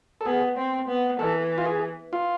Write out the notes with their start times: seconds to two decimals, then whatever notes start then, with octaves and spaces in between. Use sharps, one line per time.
0.21 A4
0.25 B3 G#4
0.57 C4
0.88 B3
1.19 E3 A4
1.58 F4
1.66 G#4
2.13 F4